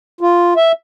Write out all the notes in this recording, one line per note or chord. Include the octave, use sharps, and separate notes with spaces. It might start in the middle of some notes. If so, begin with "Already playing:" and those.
F4
E5